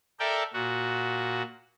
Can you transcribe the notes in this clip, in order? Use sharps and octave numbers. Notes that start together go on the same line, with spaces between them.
A4 A#4 D5 E5 G5
A#2 F#4